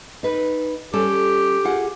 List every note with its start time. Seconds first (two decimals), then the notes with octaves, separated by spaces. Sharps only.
0.23 D#4 B4
0.93 G3 C#4 G4 A4
1.65 F4 G#4 F#5